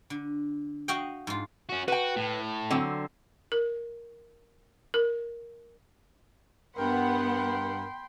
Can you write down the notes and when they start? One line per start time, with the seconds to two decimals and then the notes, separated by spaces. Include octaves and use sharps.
0.10 D3
0.88 F#4 D#5 F5 G5
1.27 G#2 F4
1.69 C#4 F#4
1.88 F#4 B4 G5
2.16 A2
2.70 D3 F#3 C4
3.52 A#4
4.94 A#4
6.77 G2 B3 A#4 F#5 G5 B5 C6